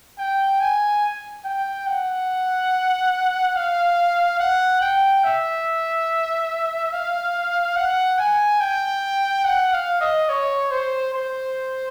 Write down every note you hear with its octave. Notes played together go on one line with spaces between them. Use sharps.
G5
G#5
G5
F#5
F5
F#5
G5
E5
F5
F#5
G#5
G5
F#5
F5
D#5
C#5
C5
C5